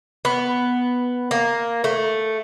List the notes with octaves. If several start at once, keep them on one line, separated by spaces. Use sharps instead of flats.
B3
A#3
A3